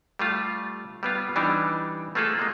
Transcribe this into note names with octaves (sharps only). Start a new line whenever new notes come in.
G3 A3 F4
G3 B3 F4
E3 G3 D4 D#4
A3 A#3 F4 G#4 A4
G#3 A#3